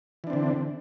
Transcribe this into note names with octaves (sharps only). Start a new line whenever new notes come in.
D3 E3 C4 D4